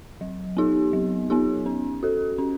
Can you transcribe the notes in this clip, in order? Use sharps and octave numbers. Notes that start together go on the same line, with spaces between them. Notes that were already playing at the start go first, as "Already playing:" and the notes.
F#3
B3 D#4 G4
F#3
B3 D#4 G4
C#4
F#4 A4
C#4